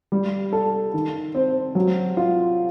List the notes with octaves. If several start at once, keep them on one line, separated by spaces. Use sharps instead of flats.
G3
A4
D#3
C4
F#3
F4